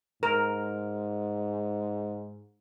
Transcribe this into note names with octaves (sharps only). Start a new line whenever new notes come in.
G#2 A#4